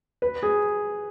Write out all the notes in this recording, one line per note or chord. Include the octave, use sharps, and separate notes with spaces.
B4
G#4